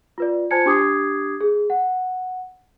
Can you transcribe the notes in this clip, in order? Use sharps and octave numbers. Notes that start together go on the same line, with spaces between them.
F4 B4 D5
F4 C5 G#5 A5 G#6 C#7
D4 G4 D6 D#6 G#6 C7
G#4
F#5